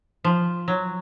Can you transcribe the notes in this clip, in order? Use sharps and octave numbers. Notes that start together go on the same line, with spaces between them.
F3
F#3